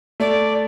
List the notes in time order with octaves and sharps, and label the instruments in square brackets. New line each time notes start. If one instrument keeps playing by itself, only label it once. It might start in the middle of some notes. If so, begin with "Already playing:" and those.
[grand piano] A3 [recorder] D5